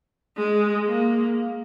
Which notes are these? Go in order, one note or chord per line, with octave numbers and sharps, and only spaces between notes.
G#3
A#3